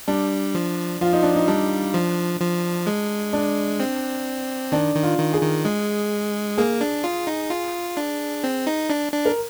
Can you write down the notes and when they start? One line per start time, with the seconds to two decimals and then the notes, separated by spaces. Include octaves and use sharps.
0.08 G3 D4
0.55 F3
1.01 F3 F4
1.13 D#4
1.23 D4
1.35 D#4
1.48 G3 D4
1.94 F3
2.40 F3
2.87 G#3
3.33 D4
3.80 C4
4.72 D#3 D4
4.95 D#3
5.03 F4
5.19 D#3
5.33 G#4
5.42 D#3
5.65 G#3
6.57 A#3 G#4
6.81 D4
7.04 F4
7.27 D#4
7.50 F4
7.97 D4
8.44 C4
8.67 D#4
8.90 D4
9.12 D4
9.26 A#4